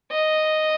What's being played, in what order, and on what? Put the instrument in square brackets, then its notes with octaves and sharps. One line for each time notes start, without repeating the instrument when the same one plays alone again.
[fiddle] D#5